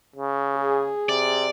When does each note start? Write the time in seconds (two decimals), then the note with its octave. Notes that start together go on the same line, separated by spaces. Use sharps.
0.16 C#3
0.58 G#4
1.09 C3 D5